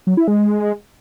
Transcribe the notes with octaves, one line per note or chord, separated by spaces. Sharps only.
F#3
E4
G#3